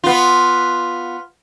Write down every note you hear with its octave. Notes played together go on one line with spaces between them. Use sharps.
B3 F4